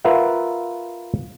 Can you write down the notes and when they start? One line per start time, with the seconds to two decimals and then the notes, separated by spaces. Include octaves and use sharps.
0.05 F4 A#4 B4 E5 F#5